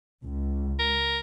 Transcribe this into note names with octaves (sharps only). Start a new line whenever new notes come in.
C#2
A#4